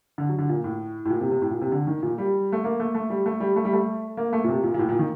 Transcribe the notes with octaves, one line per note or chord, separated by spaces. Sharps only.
D3
F#3
D3
A#2
A2
A2
A#2
C3
C3
A2
A#2
C3
D3
D#3
A#2
G3
A3
A#3
A3
A3
G3
A3
G3
A3
G3
A3
A#3
A3
A#2
C3
A#2
A#2
A2
A#2
D#3